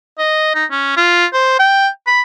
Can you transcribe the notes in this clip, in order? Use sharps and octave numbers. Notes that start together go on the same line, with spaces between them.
D#5
D#4
C#4
F4
C5
G5
B5